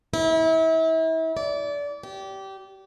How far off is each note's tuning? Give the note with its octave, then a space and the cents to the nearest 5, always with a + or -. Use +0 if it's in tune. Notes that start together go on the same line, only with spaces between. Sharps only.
E4 -35
D5 -25
G4 -20